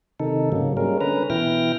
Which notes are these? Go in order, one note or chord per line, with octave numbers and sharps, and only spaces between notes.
C3 D#3 D#4 A4
G#2 C#3 F#3 A#3
G3 G#3 A#3 C#4 A#4
D3 C#4 B4 A#5
B2 E3 E4 G5 F6 A#6